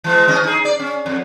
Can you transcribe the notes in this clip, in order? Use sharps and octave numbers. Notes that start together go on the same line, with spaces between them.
E3 G#3
E3 C#4 D#5
D#4 G#4
D5
C#4
F2